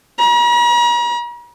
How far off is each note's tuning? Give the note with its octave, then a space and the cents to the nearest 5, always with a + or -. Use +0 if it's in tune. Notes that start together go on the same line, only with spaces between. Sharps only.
A#5 +45